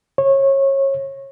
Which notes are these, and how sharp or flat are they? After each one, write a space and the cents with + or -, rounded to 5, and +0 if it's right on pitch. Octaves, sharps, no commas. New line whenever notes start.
C#5 -25